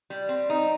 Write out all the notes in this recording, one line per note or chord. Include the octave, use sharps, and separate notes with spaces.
G3
C4
D#4